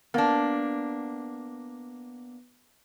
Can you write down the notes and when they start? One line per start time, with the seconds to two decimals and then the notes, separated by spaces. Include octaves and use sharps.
0.14 A#3 B3 D4